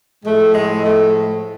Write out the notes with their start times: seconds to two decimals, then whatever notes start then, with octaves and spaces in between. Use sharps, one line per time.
0.25 A2 F3 G#3 A3
0.54 G#3
0.85 A3